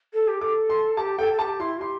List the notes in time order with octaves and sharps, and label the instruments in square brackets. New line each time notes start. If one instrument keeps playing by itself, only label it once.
[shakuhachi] A4
G4
[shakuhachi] A4 [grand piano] D6
[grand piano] C6
[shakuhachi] G4 [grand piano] A5
[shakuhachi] A4 [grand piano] G5
[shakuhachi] A4
[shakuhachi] G4 [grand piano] A5
[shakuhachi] E4 [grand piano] C6
[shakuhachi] G4 [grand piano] C6